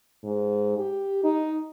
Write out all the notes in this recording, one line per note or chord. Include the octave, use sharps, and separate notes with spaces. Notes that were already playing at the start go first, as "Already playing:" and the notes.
G#2
G4
D#4